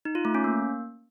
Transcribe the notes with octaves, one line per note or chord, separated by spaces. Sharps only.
D#4
F4
A3
C#4
A#3